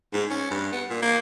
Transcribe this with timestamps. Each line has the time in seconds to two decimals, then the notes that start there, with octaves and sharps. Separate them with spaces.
0.13 G#2
0.30 C#4
0.50 G2
0.73 B3
0.90 A#2
1.02 A#3